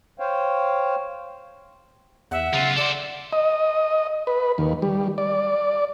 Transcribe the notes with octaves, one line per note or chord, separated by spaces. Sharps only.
C5 C#5 F5 G5
E2 E5 F#5
B1 C#3 F4
A4 C5 D5 D7
D#5
B4
D#2
G3
D5